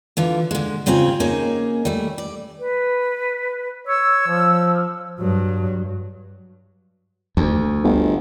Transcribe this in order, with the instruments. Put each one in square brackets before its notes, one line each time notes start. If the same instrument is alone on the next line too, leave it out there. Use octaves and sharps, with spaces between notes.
[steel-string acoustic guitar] D3 E3 F4
D3 G#3
G#2 C#3 C4 F4 G5 G#5
A#3 C#4 D#4 G#4 G#5
G3 A3
D5
[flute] B4
[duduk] C#5 [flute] E6
[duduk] F3
[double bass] G2 F#3
[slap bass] D2
[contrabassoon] G1